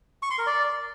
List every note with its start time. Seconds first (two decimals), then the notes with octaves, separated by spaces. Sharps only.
0.23 C#6
0.31 C6
0.39 A#4
0.47 D5